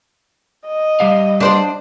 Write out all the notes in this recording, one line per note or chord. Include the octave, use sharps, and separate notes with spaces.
D#5
G3 G4 F5
D4 C5 D5